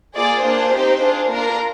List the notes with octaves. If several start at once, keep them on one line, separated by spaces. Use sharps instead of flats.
A#3 F4 G#4 D5
A#3 D4 F4 G#4 C5
C4 D#4 G4
D4 F4 G#4
A#3 D4 F4 A#4